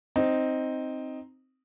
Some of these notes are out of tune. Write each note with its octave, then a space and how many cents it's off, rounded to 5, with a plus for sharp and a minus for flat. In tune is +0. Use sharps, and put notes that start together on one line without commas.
C4 +0 D#4 +0